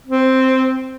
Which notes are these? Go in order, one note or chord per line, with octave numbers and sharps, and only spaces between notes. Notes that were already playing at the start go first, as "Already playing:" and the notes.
C4